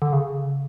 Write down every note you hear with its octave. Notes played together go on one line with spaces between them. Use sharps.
D3
C#3